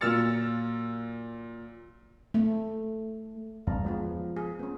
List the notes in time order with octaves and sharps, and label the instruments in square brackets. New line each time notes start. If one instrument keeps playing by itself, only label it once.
[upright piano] A#2 F#3 E6 F6 A6 C#7
[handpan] A3
[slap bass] E2 G2 [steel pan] F5 A5 A#5
[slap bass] F3 [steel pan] G#3 B3 F4
[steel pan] G#4
B3 C#4